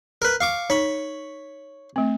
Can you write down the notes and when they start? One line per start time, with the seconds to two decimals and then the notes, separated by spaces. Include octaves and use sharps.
0.22 A#4 B4
0.41 F5 C#6 D6
0.70 D#4 C#5 B5
1.96 A3 C4